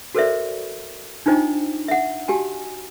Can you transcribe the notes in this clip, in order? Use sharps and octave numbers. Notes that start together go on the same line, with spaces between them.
F#4 A4 A#4 C5 D5 E5
D4 D#4 F4 C5 D#5 G5
E5 F#5
F#4 G4 G#5 A5